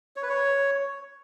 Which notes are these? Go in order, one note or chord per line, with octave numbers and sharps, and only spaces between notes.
C#5
B4
C#5